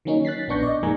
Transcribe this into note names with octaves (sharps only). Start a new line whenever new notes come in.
D#3 F#3 A#3 C#4 D#4
F#6 A6 B6 C7
A#1 B3 D4 C#6 G6 A#6
D5 D#5
F#2 D#3 G#3 A#3 G#5 A#5